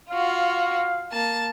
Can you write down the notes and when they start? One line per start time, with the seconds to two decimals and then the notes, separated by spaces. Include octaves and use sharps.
0.10 F4 F#4 F5
1.12 A#3 A5